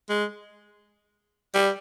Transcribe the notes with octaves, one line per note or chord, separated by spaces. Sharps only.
G#3
G3